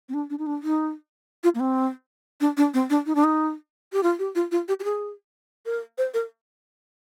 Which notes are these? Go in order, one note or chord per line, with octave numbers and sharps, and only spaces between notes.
C4
D4
D4
D#4
D4
D#4
F4
A#3
C4
D4
D4
C4
D4
D#4
D4
D#4
G4
F4
G4
F4
F4
G4
G4
G#4
A#4
C5
A#4